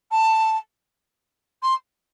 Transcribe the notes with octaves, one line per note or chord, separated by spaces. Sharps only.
A5
C6